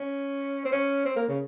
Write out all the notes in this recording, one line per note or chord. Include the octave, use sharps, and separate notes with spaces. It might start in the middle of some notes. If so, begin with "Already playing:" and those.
Already playing: C#4
C4
C#4
C4
A#3
C#3